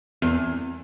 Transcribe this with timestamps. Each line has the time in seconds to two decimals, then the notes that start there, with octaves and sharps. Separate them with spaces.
0.22 E2